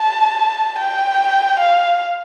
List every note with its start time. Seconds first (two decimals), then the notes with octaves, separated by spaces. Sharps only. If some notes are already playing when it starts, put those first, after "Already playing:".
Already playing: A5
0.79 G5
1.59 F5